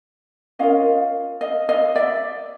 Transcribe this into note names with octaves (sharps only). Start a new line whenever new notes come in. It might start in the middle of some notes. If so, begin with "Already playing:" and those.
C#4 F4 A#4 D#5 F5
D#5 F5
D#5 F5
D5 E5